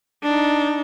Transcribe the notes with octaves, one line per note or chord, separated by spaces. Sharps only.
D4 D#4